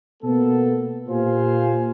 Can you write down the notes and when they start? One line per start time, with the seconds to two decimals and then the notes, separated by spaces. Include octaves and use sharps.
0.23 B2 A#3 B3 A4
1.09 A#2 F4 G4 C5 F5 G#5